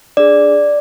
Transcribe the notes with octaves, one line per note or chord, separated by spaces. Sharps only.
D4 G#4 D5